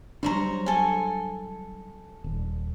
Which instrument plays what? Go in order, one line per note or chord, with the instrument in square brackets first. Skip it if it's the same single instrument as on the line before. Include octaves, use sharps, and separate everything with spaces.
[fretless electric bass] F#3 G3 D4 [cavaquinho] C5 C#5 A#5
[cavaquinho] A4 G#5
[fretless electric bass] D#1